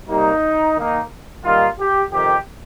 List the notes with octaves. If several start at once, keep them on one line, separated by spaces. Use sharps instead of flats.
C3 G3 A#3 D#4
D#3 A#3 D#4
D#3 G3 A#3 D#4 F4
G4
F2 C3 D#3 G4